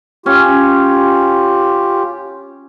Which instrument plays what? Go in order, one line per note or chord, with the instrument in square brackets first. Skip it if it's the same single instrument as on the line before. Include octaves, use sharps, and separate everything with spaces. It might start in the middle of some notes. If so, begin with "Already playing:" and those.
[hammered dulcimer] C#4 [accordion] F4 G4